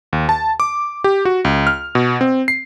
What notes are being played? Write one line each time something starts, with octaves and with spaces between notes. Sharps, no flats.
D#2
A5
D6
G4
F#4
C#2
F6
B2
C4
C7